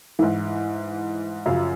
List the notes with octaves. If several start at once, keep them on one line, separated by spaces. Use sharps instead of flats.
G#2 E3 E5
F#2 C#3 F3 F5